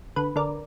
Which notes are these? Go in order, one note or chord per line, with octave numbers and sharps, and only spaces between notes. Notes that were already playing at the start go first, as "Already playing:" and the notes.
D3 B4
D3 A#4 D5